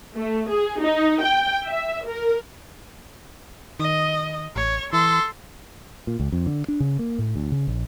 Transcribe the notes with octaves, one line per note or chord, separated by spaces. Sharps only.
A3
G#4
D#4
G5
E5
A#4
D#3 D#5
A1 C#5
E3 A4 C6
A#2
C#2
F2
D3
D4
C#3
A#3
A2
D2
C#3
A#1